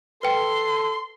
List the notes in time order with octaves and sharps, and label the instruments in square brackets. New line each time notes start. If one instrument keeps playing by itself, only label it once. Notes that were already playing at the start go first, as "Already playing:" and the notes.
[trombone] A4 [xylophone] B4 G5 [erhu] C6